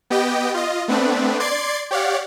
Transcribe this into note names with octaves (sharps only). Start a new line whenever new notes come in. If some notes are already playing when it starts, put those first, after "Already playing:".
B3 G4 D#5 G5
F4 D#5
A3 B3 C4 D4 B4
D5 C6 G#6 A6 C7 D7
G4 C#5 D5 F5 F#5